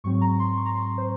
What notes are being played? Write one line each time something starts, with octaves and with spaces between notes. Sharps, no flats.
G#2 F#3 C4 C#6
A#5
C6
C#6
A#5
C6
C5